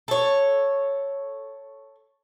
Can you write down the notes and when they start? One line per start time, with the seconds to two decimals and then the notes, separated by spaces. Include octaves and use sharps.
0.08 A4 C#5